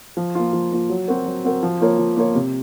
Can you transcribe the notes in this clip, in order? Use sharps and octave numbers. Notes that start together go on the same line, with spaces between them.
F3
A#3 F4
F3
A#3 F4
F#3
C4 F#4 A#4
F#3
C4 F#4 A#4
F3
A#3 F4 A#4 C#5
F3
A#3 F4 A#4 C#5
C3